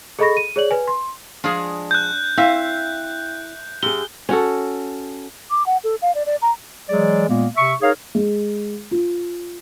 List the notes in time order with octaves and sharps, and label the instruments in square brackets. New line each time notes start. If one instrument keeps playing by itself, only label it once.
[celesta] G#4 A4 D#5 B5 C#6 A#6
D#7
G#4 C#5 D5 F#7
B4 G#5
C6
[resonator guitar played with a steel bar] F3 G#3 G#4 [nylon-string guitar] D4
[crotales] F#6 G6
[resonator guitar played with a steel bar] C4 E5 F5 [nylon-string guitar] E4
[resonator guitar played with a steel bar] F#2 [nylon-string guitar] G4 G#4 [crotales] G7
[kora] C#4 F#4 A4
[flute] D6
F#5
A4
F5
D5
D5
A#5
[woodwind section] E3 F#3 G#3 G#4 D5
A#2 G#3 A#3 B3
C3 E5 C#6
D#4 G#4 A#4 C#5 F5
[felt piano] G#3
F4